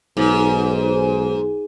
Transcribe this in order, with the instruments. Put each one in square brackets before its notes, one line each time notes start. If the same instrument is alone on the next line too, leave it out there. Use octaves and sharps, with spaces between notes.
[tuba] B1 [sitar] G#2